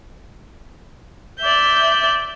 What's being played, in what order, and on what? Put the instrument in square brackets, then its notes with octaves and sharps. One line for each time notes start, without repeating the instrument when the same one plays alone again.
[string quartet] D5 E5 G6